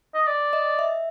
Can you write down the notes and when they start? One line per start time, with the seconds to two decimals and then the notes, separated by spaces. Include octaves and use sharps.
0.14 D#5
0.27 D5
0.53 D#5
0.79 E5